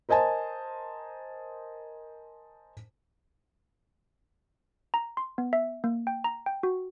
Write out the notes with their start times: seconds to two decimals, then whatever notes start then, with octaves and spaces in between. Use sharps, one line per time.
0.09 A#4 C5 D#5 G#5 A5
4.94 A#5
5.17 C6
5.38 B3
5.53 E5
5.84 A#3
6.07 G5
6.24 A#5
6.46 G5
6.63 F#4